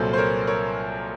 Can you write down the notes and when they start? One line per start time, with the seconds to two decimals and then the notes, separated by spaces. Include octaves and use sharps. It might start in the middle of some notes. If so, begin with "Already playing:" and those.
Already playing: C2 A#2 F#3 A4 C5
0.13 C5
0.17 A#4 C#5
0.47 A#4 C#5